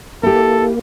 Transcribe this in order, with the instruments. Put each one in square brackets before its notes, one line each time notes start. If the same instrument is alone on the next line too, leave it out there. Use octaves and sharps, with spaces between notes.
[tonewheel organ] A#3 [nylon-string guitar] E4 G4 [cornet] A4